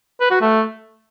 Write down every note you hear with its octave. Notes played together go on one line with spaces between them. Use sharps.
B4
F#4
A3